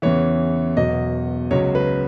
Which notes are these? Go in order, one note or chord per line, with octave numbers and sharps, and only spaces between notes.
E2 C#3 E3 C#5
E1 E2 B2 F#3 D#5
C#2 C#3 F#3 C#5
B4